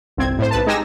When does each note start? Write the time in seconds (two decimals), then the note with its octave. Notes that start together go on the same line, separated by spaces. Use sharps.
0.17 G1 C2 C4 G#6
0.38 A2 C5
0.51 B1 B4 A5
0.67 G#3 D#4 G4 G#5 E6 A#6